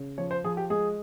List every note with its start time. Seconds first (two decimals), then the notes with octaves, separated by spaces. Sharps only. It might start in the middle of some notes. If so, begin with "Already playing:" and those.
Already playing: C#3
0.18 F3 C#5
0.31 C5
0.44 F3 G#4
0.57 G4
0.70 G#3 G#4